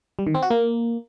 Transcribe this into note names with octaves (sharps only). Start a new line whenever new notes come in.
G3
D#3
C4
F#4
A#3